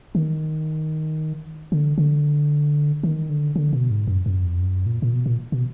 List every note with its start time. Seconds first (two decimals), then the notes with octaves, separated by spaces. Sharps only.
0.15 D#3
1.72 D3
1.98 D3
3.03 D#3
3.30 D3
3.56 D3
3.73 B2
3.90 G#2
4.07 F#2
4.26 F#2
4.43 F2
4.61 F#2
4.86 A#2
5.02 A#2
5.12 B2
5.26 A#2
5.52 B2